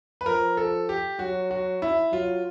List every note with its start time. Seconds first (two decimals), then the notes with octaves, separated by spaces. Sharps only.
0.21 B4
0.26 F3 A#4
0.57 A4
0.89 G4
1.19 F#3 F#4
1.51 F#4
1.82 E4
2.12 F#3 F4